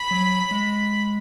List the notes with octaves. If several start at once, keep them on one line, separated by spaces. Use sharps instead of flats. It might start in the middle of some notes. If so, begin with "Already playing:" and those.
Already playing: B5
F#3
G#3